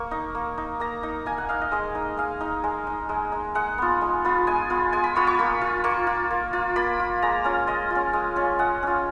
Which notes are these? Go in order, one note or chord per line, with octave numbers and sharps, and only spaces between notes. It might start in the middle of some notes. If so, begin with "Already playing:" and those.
Already playing: A#3 C#6
D#4
A#3
D#4
A#3 A#5
D#4
A#3 G#5
F#5
D#4 F5
D#5
G#3 D#5
D#4
G#3 F5
D#4
G#3
D#4
G#3
D#4
G#3 F#5
B3 F4
G#3
B3 F4
G#3 G#5
B3 F4
G#3 G#5
B5
B3 F4 C#6
C#6
A#3 B5
F4
A#3 C#6
F4
A#3
F4
A#3 B5
F4
G#3 A#5
C#4 F4
G#3 D#5
C#4 F4
G#3
C#4 F4
G#3 F#5
C#4 F4